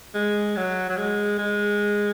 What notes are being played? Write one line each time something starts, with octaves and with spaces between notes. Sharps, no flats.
G#3
F#3
F#3
G#3
G#3